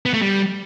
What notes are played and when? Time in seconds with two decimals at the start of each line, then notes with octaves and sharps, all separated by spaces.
0.06 B3
0.14 A3
0.22 G3